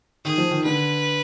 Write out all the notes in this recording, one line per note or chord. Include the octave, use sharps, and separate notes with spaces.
D#3 G#4
F3
D#3
D3 B4